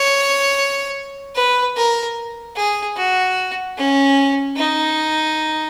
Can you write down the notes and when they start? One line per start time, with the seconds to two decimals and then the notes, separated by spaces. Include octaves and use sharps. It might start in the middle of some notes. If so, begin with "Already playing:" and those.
Already playing: C#5
1.35 B4
1.76 A#4
2.56 G#4
2.96 F#4
3.77 C#4
4.57 D#4